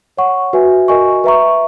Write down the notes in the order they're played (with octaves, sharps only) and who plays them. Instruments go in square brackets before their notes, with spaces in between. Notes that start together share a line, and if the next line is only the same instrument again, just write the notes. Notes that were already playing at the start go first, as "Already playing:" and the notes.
[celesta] C#5 F#5 C#6
F#4 B4 E5 G#5
F#4 A#4 D#5 G#5 C#6
B4 E5 A#5 C#6